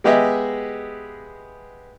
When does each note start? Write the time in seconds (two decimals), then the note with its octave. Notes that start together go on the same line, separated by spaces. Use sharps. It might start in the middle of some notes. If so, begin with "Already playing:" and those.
0.04 G#3 B3 G4 G#4 D#5 E5